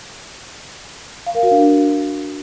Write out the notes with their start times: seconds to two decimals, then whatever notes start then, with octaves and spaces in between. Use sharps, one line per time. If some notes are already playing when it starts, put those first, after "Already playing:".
1.26 F5
1.35 A#4
1.43 F#4
1.51 D4